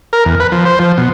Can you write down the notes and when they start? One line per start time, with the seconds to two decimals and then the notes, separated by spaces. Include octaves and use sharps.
0.13 A#4
0.25 E2
0.40 B4
0.52 F3
0.65 C5
0.79 F3
0.98 B2